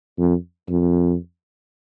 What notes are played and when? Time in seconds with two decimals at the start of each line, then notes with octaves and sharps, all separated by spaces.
0.19 F2
0.69 F2